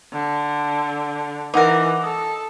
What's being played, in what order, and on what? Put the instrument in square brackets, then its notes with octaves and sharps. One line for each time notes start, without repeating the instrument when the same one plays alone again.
[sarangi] D3
[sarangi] E3 [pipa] D#4 A#4 [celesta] F#5 D6
[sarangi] A4 [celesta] D#6